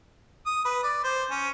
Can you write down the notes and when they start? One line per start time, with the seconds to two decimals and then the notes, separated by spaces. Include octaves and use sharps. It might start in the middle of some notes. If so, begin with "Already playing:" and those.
0.46 D#6
0.65 B4
0.83 D5
1.04 C5
1.31 C#4